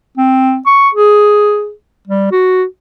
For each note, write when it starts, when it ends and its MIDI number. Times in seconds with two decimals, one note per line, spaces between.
0.17 0.59 60
0.66 0.89 85
0.95 1.72 68
2.08 2.31 55
2.32 2.64 66